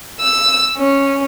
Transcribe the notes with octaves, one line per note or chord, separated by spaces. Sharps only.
E6
C#4